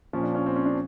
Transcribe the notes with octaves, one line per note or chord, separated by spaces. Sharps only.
A#2 F3 C#4
D4
C#4
C4
C#4
D4